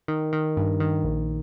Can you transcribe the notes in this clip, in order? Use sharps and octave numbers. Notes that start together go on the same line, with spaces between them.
D#3
D#3
G2
D#3
A#1